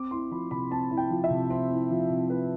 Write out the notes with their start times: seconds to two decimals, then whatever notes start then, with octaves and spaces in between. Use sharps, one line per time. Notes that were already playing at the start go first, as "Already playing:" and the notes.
Already playing: C4 D6
0.11 E4 C6
0.31 F3 B5
0.51 C3 B5
0.71 C4 A5
0.91 E4
0.97 G5
1.10 F3
1.24 E5
1.30 C3
1.50 C4
1.70 E4
1.91 F3
2.10 C3
2.29 C4 B4